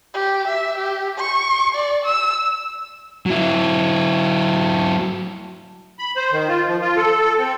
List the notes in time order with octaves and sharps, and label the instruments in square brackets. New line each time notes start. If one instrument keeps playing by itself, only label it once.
[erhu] G4
E5
G4
C#6
D5
E6
[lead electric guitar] F#3 E4
[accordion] B5
C5
D#3
F4
F3
F4
A4
C4